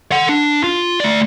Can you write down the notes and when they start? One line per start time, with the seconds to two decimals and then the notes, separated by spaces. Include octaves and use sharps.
0.12 A4 F#5
0.29 D4
0.64 F4
1.00 A3 D5